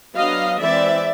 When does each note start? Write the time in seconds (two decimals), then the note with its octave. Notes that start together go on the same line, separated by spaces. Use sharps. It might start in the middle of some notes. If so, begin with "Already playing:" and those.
0.16 F#3 B3 D4 D#5 F5
0.60 E3 G#3 C4 D5 E5